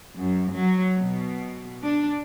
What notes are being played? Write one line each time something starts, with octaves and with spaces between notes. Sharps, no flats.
F#2
F#3
B2
D4